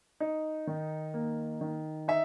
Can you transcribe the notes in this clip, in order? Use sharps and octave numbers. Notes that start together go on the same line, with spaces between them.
D#4
D#3
A#3
D#3
D#4 E5